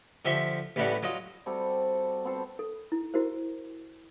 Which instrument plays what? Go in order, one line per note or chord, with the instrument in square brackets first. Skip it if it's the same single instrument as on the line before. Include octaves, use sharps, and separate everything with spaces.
[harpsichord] D3 F3 G4 E5 C6 C#6
A1 A2 E3 G3 D4 F#5
F#3 F4 D#5
[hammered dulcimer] C3 G3 F#4 A4
B3 C4 A4 C5
[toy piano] A4
E4
E4 F#4 G4 A#4 C5